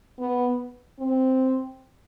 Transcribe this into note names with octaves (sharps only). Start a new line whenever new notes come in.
B3
C4